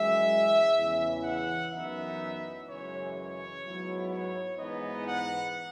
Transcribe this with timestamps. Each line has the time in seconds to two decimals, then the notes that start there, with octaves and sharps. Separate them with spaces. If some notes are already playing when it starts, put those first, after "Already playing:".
Already playing: F#2 E3 G#3 E5
0.76 E2 C#3 E3
1.23 F#5
1.71 F#2 E3 B3 D#4 E5
2.67 F#2 C#3 E3 G#3 C#5
3.15 C#5
3.63 G#2 F#3 B3 E4
4.11 C#5
4.58 G#2 E3 B3 D#4 D#5
5.07 F#5